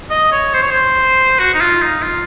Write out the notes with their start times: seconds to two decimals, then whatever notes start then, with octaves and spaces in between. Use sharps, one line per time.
0.10 D#5
0.32 C#5
0.54 C5
0.62 C#5
0.71 C5
1.39 F#4
1.54 D#4
1.61 F4
1.82 D#4
2.03 F4